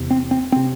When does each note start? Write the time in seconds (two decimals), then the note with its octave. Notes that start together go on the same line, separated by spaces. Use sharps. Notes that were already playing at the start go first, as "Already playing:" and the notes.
Already playing: E2 C3
0.11 C4
0.31 C4
0.52 C3 C4